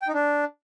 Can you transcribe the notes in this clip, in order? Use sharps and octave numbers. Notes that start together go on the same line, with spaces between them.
G5
D#4
D4